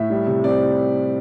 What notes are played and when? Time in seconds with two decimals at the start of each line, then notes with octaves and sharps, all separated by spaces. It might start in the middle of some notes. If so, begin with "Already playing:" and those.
Already playing: A2 E5
0.10 G3
0.27 C3
0.44 C4 D5